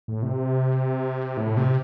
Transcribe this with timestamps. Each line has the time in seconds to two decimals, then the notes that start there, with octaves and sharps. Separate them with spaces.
0.08 A2
0.23 C3
1.37 A2
1.57 C3